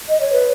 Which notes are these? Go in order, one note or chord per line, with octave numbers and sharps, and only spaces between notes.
D#5
C#5
B4